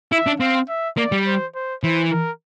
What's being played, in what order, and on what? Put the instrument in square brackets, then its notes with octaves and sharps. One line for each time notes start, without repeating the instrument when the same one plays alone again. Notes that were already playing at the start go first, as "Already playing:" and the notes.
[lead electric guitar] E4 [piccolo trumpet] E5
[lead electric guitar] D4
[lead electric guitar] C4 [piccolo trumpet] F5
[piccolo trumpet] E5
[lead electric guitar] A#3 [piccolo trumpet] D5
[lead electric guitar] G3
[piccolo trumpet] C5
C5
[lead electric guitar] E3 [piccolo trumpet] C5
[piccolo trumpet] A#4